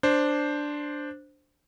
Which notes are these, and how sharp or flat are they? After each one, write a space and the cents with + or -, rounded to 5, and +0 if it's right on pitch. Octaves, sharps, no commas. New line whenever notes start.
D4 +0 C5 +0